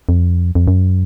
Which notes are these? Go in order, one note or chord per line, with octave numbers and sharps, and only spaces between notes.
F2
F2
F#2